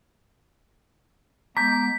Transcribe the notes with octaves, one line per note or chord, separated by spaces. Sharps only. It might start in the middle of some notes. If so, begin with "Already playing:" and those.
G#3 B3 A#5 D6 G6 B6